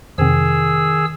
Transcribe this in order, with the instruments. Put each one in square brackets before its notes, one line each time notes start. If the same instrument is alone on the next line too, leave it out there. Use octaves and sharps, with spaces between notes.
[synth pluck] F2 C3 [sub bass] D#3 [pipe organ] G#4 E6